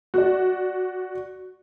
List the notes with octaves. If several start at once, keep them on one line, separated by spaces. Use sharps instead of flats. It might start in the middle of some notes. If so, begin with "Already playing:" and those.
F#4 D5